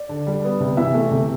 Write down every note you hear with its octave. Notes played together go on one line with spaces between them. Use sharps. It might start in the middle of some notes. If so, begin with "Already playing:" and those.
Already playing: D5
D3
G3
B3
C3
E3 E5
A3
C3